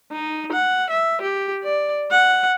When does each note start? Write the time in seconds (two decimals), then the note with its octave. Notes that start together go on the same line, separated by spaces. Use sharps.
0.12 D#4
0.52 F#5
0.90 E5
1.22 G4
1.64 D5
2.11 F#5